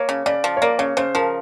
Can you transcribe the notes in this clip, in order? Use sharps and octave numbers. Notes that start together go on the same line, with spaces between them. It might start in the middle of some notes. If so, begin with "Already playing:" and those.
Already playing: A#3 C#5
C#3
C#3 D5
F3
C#5
A#3 D5
C#3 C#5
C#3 C5
F3 A#4